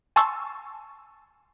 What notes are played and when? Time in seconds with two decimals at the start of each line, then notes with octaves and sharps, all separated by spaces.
0.16 G#5 A5 C6 C#6 E6